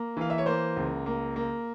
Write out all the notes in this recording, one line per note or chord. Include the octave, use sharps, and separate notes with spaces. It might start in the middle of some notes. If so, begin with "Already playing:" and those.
Already playing: A#3
E3 F5
E5
C#5
A#3 C5
C#2
A#3
A#3